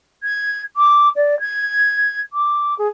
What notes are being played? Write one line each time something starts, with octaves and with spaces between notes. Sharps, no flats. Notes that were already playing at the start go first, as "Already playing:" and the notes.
G#6
D6
D5
G#6
D6
G#4